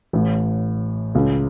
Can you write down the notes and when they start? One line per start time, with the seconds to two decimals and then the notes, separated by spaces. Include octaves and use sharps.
0.13 A1 A2
1.15 C#2 C#3